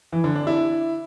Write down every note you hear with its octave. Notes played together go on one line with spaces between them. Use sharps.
E3
D3
D4
E4